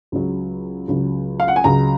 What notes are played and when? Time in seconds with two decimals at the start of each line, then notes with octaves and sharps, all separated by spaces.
0.12 C#2 C#3 F#3
0.88 C#2 C#3 F#3
1.40 F5
1.48 F#5
1.56 G#5
1.64 C#2 C#3 F#3 A#5